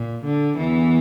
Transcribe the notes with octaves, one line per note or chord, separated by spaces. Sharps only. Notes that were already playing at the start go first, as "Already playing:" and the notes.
Already playing: A#2
D3
E2 E3